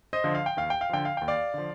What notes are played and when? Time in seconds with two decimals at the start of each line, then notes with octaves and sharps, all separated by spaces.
0.13 C5 D#5
0.24 D3 F3
0.35 F5
0.46 G5
0.57 D#2 F5
0.70 G5
0.81 F5
0.89 D3 F3 G5
1.05 F5
1.17 D#2 G5
1.28 D5 F5
1.54 D3 F3